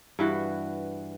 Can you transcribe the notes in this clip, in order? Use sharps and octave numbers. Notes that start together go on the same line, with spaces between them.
G2 E3 F#4